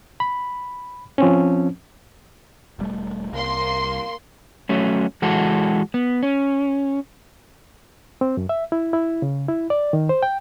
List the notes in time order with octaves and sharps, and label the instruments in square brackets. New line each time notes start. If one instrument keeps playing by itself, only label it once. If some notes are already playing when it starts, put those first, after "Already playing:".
[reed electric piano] B5
F3 C4 C#4
[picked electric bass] E1 G3 A3
[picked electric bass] C2 [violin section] A#3 C6
[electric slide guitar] F#3 A3 C#4
E3 G#3 F#4 A4
B3
C#4
[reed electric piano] C4
F#2
E5
E4
E4
C#3
E4
D5
D#3
C5
G5